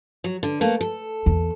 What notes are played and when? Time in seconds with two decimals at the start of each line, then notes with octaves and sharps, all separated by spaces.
0.24 F#3
0.43 D3
0.61 A3 A#3
0.81 A4
1.26 E2